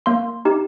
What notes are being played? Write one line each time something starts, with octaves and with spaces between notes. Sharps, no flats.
A#3 C6
D#4 G4